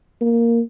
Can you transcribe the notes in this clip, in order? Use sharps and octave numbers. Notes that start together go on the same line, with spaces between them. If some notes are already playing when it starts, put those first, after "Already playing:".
A#3